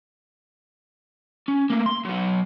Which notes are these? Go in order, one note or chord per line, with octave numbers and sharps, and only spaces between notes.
C#4
A3 A#3
C6
F#3 B3